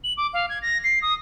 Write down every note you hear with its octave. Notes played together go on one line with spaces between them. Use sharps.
F#7
D6
F5
G#6
A#6
C7
D#6